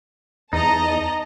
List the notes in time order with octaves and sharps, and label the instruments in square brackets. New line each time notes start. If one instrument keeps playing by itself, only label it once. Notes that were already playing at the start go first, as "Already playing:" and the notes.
[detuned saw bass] E2 [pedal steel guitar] D#4 [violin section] D#5 A5 A#5